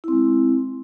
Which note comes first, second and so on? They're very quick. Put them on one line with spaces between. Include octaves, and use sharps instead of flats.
E4 C4 G#3